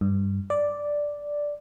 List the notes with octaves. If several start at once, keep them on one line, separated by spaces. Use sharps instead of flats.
G2
D5